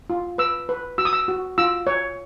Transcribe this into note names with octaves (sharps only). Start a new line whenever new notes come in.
F4
B4 E6
B4
F#4 E6
D#6
E6
F#4
F4 E6
C#5